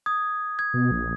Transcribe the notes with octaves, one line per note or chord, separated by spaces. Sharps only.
D#6 G#6
G#6
B2
A#1